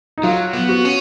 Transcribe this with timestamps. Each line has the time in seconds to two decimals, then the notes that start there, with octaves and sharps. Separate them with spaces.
0.18 D#4
0.23 F#3 F4
0.53 B3
0.69 F#4
0.85 C#4